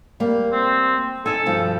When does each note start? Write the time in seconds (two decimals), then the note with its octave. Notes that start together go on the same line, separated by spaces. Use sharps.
0.20 G3 A#3
0.53 C4
1.26 D#4 A4 G#5
1.46 G2 B2 F3